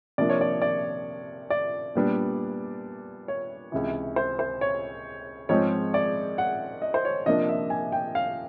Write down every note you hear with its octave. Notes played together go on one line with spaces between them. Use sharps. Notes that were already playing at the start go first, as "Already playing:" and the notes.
C3 F3 A#3 D4 D5
C#5
D5
D5
D5
A#2 G3 B3 D4
C#5
C#2 C3 E3
C5
C5
C#5
G#2 F3 G#3 C4 C#5
D5
F#5
D#5
C5
C#5
C3 F3 A#3 D4 D#5
E5
G#5
G5
F5